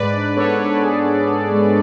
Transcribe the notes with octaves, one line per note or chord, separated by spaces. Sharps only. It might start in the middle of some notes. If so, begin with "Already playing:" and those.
Already playing: G#2 B4 D5
D4
B3 A4 C#5
D4
C#5
G#2 G#4 B4
B3
D4
G#3